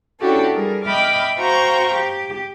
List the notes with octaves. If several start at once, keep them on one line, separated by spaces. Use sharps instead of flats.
C#4 D4 E4 F#4 G4 A4
G3 G#4 A#4
D#5 E5 G5 B5 D6 F6
F#4 C5 F5 G5 A#5 C#6
G4